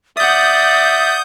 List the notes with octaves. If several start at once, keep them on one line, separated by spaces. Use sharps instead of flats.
D5 E5 F#5 D#6 G6 A6